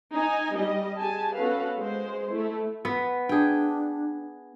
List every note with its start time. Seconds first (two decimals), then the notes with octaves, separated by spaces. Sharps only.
0.13 D#4 G#5
0.55 G3 D#5
0.98 G4 G#4 G#5 A5
1.35 B3 C#4 F#4 A4 B4 F5
1.77 G#3 C5
2.30 A3 E4
2.85 B3 B4
3.29 D4 G#4 G5